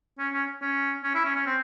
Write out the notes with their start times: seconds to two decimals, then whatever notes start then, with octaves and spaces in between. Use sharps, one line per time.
0.19 C#4
0.34 C#4
0.62 C#4
1.04 C#4
1.15 E4
1.25 C#4
1.36 C#4
1.46 C4